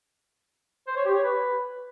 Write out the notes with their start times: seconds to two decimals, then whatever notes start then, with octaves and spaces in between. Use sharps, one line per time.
0.87 C5
0.96 C#5
1.05 G4
1.14 C#5
1.23 B4